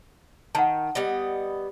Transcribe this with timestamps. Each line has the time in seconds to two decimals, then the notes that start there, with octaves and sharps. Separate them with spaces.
0.55 D#3 F#5 A5
0.95 G3 B3 D#5